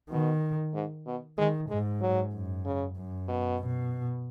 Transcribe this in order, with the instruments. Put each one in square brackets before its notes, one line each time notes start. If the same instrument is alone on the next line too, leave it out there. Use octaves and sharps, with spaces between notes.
[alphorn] B2 [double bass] D#3
[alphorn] G#2
B2
[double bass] D#3 [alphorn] G#3
[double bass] G#2 [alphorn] G#3
[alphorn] F#3
[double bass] F#2
[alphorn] C#3
[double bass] F#2
[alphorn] B2
[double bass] B2